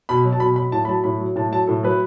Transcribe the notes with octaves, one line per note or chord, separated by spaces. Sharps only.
B2 B5
F#3
A5
B2 B5
F#3 B5
A2 A5
B5
F#3 A5
A2 B5
F#3
A2 A5
F#3 A5
A2 A4
F#3 B4